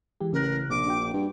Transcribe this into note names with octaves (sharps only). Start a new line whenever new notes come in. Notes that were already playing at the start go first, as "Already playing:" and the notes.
E3 G#3 G4
A1 C#3 A#4 F#6
A#1 C3 D6
D4 F#4 G5
G2